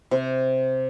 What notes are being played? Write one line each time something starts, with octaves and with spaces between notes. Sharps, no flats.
C3